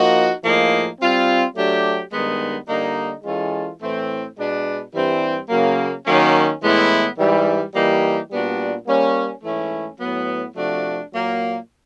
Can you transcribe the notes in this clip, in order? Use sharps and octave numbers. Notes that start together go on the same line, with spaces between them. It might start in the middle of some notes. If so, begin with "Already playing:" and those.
Already playing: F3 A#3 D#4 F#4
A2 F3 A#3 D#4 G#4
G3 C4 F4
F#3 A3 D4 G4
G2 D#3 G#3 B3 D#4
D3 G3 A#3 D#4
E3 G#3 C#4 F4 A4
A2 E3 A3 C4
B2 G#3 B3 D4
G2 E3 G3 C4
C#3 F#3 A#3
D#3 F#3 A#3 C#4
A2 E3 G#3 B3 E4
G#2 E3 G3
E3 G3 A#3 D#4 G4
A#2 G3 B3 D4 F#4
G3 A#3 C#4
G#2 E3 A3 C#4 E4
A2 F#3 B3
C3 F3 A3 D4 F#4
A#2 F#3 A#3